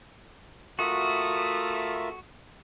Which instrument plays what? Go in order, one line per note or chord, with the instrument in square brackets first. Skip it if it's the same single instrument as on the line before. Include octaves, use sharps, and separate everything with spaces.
[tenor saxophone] A3 [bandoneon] F4 A#4 E5 [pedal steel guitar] F#4 [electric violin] D#6